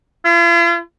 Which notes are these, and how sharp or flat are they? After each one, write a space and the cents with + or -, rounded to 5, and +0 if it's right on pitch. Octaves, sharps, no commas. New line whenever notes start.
F4 -45